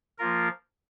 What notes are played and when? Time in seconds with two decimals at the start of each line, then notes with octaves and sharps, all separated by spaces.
0.18 F3 A#3 F4 A#4